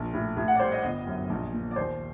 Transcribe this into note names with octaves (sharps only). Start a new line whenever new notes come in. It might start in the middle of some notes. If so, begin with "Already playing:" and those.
Already playing: A#1
A2
A2
F#5
D5
G3 C5
D#5
G1 D#5
F#2
A#1
A#2
D5
D#2 C5